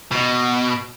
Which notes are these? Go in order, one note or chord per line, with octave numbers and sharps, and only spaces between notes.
B2